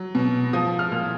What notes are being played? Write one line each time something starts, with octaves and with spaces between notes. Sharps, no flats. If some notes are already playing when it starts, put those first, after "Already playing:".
Already playing: F#3
B2
F3 D#6
F6
A#2